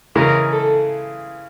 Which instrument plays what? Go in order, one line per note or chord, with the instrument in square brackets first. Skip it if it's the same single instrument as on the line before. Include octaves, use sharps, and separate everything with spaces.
[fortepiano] C#3 E3 G#3 [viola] A#4
[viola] A4